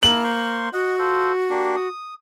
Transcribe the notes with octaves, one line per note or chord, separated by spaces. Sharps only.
A#3 E4 A5 F#7
C5 C6 C#6
F#4 D#5 F#5
F4 A4 C5
A#3 D4 G4
D#6